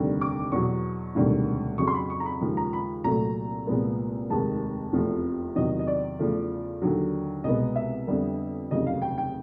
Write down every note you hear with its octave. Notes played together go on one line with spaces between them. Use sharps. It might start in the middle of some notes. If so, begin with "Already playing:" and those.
Already playing: F1 D#2 D3 G3
D6
E2 B2 F#3 C#6
E1 D2 C3 D#3 G3
F2 C#3 F#3 C#6
C6
B5
C#6
A#5
B5
D#2 C#3 F3 G#3
A#5
B5
C2 A#2 F#3 A3 A#5
C2 A#2 F3 G#3 B3
F1 D#2 D#3 G#3 A5
F1 E2 C3 F3 A3
E2 C3 D#3 F#3 D#5
D#5
D5
E2 C#3 F3 A3
D#2 D3 F#3
C2 B2 G#3 B3 D#5
E5
F2 D3 G3 B3
F1 D#2 C#3 F#3 D#5
F5
G5
G5